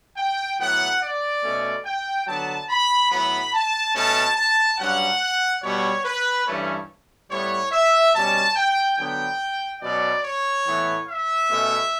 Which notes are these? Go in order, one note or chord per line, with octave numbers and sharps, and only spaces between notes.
G5
A2 F#3 B3 F#5
D5
B2 A3 C#4
G5
D3 F#3 B3 A5
B5
A2 F#3 B3 B5
A5
B2 A3 C#4 A5
A5
G2 F#3 C#4 F#5
B2 G3 B3 C#5
B4
G2 E3 A3 C#4
A2 G3 B3 C#5
E5
B2 G3 C#4 A5
G5
D3 F#3 B3 G5
B2 F#3 C#4 D5
C#5
A2 E3 B3
E5
B2 A3 C#4